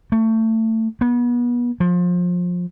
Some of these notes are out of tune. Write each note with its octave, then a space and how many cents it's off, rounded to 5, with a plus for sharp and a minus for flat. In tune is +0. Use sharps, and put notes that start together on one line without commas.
A3 +25
B3 -35
F3 +25